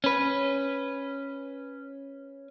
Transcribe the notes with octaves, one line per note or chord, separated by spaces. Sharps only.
C#4 B4